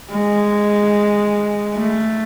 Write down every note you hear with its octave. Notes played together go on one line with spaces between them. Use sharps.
G#3
A3